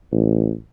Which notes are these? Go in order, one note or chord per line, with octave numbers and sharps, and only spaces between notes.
A1